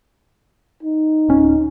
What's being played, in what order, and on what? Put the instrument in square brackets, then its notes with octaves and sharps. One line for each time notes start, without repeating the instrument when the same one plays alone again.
[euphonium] D#4
[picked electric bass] D1 C#4